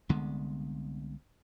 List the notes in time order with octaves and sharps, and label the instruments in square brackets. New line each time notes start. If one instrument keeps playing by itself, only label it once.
[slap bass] C2 D3 G#3 B3